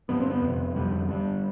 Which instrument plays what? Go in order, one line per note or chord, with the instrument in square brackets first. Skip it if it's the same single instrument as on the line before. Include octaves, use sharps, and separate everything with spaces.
[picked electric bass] G2 D3 B3
C4
B3
F2
C3
F2 D3 G3
G2 D3 G3